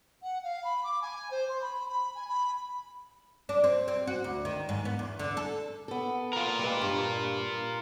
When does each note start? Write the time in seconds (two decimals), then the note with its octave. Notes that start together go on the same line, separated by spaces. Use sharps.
0.22 F#5
0.43 F5
0.64 B5
0.83 D6
1.02 G#5
1.30 C5
1.48 C6
1.61 B5
1.89 B5
2.15 G#5
2.29 B5
3.49 D4
3.64 C4
3.88 C4
4.07 F#4
4.24 D2
4.45 D#3
4.69 G#2
4.85 B3
4.99 E2
5.19 D3
5.37 A4
5.88 B3 A4
6.33 F4 A#4
6.59 G3 G#3 B4
6.81 G2